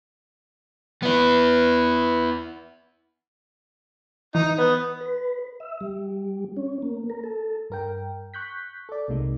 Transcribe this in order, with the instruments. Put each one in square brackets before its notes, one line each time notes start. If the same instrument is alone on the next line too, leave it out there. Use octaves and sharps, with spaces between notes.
[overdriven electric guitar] B3 E4
[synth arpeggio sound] E3 [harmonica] D#4
[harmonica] B3 [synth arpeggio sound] B4
[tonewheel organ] B4
E5
G3
C#4
A#3
A#4
A4
[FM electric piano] G2 A#4 G5
C#6 F#6 G6 B6
A4 D5
C2 C3 G#3 A#3 D#4